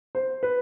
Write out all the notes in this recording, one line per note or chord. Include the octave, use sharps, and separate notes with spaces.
C5
B4